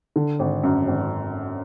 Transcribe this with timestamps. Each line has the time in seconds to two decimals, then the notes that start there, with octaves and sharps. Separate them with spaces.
0.16 D3
0.39 G#1
0.63 F#2
0.87 G#1